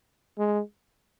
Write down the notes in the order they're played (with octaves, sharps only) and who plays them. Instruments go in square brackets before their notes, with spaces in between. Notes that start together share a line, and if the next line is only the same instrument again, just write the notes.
[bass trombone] G#3